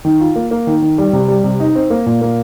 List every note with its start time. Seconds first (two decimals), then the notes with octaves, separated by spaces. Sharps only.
0.05 D#3
0.20 F4
0.36 A#3
0.51 A#3
0.67 D#3
0.82 D#3
0.98 G3
1.13 C3
1.28 G3
1.44 C3
1.60 D#4
1.75 C4
1.90 A#3
2.06 A#2
2.21 A#3